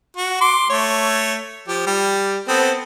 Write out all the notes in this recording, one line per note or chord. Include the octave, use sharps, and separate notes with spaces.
F#4
C6 D6
A3 C#5
F3 G4
G3 G4
B3 C4 A4